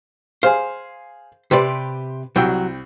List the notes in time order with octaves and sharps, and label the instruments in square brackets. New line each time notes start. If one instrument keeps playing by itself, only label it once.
[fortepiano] G#4 F5 [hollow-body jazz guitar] C5
[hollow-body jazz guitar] C3 D5 [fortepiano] G4 B4 C5
[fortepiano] C2 G5 E6 [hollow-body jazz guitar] F#3